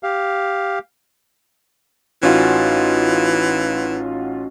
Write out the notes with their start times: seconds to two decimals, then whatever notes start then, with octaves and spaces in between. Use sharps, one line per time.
0.03 G4 F5
2.23 A1 E3 C#4 D#4 F4 F#4 F#5